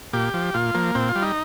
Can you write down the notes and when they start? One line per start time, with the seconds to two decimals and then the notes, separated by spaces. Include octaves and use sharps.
0.13 A#2 G4
0.34 F3
0.54 A#2 F4
0.74 F3 A#3
0.95 A#2 C4
1.09 F4
1.16 G3
1.22 D#4